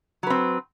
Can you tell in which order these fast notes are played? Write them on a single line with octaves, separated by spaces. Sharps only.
F#3 B4 C4